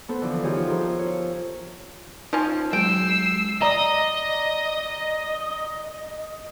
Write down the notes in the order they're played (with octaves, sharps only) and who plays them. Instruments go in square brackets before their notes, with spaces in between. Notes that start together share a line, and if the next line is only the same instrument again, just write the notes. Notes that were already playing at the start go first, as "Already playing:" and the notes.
[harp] B3 A4 B4 C5
D3 E3 F3
D#3 F3 F4 G4 G#4 C#5
F4 A4 A#4 C5
F4 C#5
[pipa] F3 C#4 [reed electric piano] D#4
[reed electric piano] F#3 G#3 [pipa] G5 [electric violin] E6 C7
[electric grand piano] D5 A#5 [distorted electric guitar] D#5